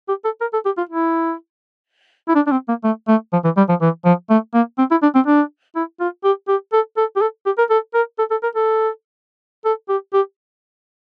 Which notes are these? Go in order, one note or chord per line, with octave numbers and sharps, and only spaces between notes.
G4
A4
A#4
A4
G4
F4
E4
E4
D4
D4
C4
A#3
A3
A3
F3
E3
G3
F3
E3
F3
A3
A#3
C4
E4
D4
C4
D4
E4
F4
G4
G4
A4
A4
G4
A4
G4
A#4
A4
A#4
A4
A4
A#4
A4
A4
G4
G4